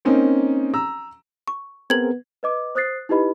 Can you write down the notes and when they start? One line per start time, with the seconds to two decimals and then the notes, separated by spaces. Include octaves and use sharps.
0.05 A#3 C4 C#4 D#4
0.74 A#5 E6
1.47 C#6
1.90 B3 C4 G#4 A#4 G#6 F#7
2.43 B4 D#5 D6
2.75 C5 D#6 F#6 A6 C7
3.09 D#4 E4 G4 B4 D#5 B5